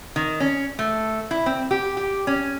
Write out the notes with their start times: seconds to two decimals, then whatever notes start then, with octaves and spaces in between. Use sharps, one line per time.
0.16 D#3
0.40 C#4
0.79 A3
1.31 E4
1.46 C4
1.71 G4
1.97 G4
2.27 C#4